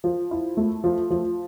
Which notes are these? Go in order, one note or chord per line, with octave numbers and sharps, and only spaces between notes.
F3
E4
A3
F3
F3